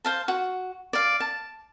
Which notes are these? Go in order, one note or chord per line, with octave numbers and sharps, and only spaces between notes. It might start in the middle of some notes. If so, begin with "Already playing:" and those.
C5 F5 A5
F#4
D5 F5
A5